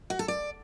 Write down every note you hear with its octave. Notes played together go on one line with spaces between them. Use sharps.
F#4
A4
D5